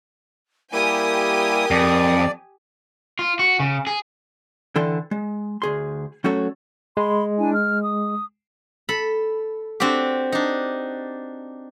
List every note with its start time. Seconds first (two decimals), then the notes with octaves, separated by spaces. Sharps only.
0.73 G3 A#3 E4 G4 A#4 G#5 D#6
1.71 F2 D5
3.19 F4
3.39 F#4
3.60 C#3
3.87 G#4
4.76 D3 E3 A4 G5 C6
5.11 G#3
5.62 D2 G#4 C6
6.24 F#3 A3 C#4 F#4 A4 C#5
6.97 G#3 B5 C6
7.38 D4 E4 G#5
7.55 F6
7.82 D#6
8.89 A4 B5
9.80 C4 D4 F#4 G4
10.32 D4 D#4